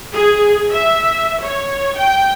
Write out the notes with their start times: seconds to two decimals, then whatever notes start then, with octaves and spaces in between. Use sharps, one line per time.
0.12 G#4
0.72 E5
1.42 C#5
1.97 G5